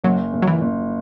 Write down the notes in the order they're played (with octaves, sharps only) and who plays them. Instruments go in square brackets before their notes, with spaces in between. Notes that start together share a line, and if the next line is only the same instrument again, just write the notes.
[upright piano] F#1 [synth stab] F#3
[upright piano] F#1
[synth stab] F#3
E3
[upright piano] F#1